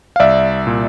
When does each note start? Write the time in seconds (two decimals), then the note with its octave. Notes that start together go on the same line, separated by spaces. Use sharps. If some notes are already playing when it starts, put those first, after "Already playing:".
0.16 F5
0.20 C2 D5 E5
0.67 A#2